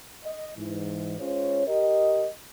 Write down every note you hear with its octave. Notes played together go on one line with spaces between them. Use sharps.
D#5
G#2 E3
G#3 C#4 F4 C5 C#5
G4 A#4 D#5